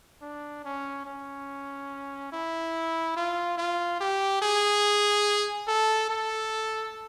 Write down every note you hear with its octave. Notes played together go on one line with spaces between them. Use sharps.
D4
C#4
C#4
E4
F4
F4
G4
G#4
A4
A4